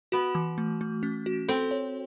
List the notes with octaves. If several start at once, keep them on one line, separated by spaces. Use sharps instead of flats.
B3 F#4
E3
A3
A3
C#4
F#4
C4 A4
C#5